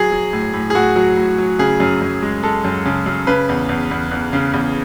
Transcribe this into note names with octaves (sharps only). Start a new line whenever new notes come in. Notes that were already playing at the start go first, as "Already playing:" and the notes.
Already playing: F#3 G#4
F#3
A2
A2
G#4
A2 F#4
F#3
A2
F#3
C#3 G#4
F#2
F#2
G#3
G#3 A4
F#2
C#3
F#2
C#3 B4
E2
E2
E2
E2
C#3
E2